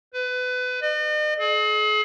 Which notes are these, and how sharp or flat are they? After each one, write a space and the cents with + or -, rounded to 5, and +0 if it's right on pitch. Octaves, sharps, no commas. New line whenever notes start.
B4 +25
D#5 -45
G#4 +40